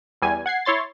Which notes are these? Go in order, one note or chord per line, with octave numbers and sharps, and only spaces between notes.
E2 G3 G#5
F#5 G#6 C7
E4 C#5 C6 A6